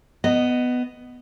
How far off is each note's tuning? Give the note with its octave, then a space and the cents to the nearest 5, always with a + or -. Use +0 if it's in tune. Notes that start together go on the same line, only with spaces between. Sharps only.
B3 +10 D#5 -10